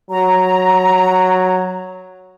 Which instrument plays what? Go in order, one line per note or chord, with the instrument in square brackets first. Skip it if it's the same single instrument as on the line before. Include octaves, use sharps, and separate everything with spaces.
[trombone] F#3 [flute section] A#5